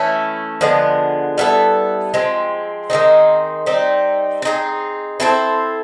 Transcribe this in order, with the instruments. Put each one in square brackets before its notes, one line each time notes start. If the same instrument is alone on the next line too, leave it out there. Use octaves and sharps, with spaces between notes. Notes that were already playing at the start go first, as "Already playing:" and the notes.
Already playing: [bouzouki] E3 A3 C#4 E4
D3 F3 G#3 B3
G3 B3 E4 A4
F3 G#3 C4
D#3 G#3 C4 D#4
G3 C4 D#4
C4 D#4 G#4
C4 E4 A4 C5